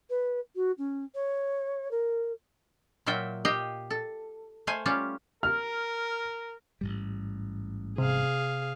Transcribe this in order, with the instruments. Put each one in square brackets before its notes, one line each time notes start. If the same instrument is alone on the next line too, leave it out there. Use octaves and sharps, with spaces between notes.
[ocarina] B4
F#4
C#4
C#5
A#4
[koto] A#2 F#3 F4 E5 G5
G4 D#5 F5 G5
A4
A3 C5 F5 G#5
G3 C#4 F4 G4
[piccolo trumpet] A#4 [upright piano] F6
[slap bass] A1 G#2 G3
[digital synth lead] C3 [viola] G#4 F5